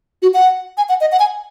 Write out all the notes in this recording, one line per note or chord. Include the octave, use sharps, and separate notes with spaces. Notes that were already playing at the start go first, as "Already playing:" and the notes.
F#4
F#5
G#5
F#5
D#5
F#5
G#5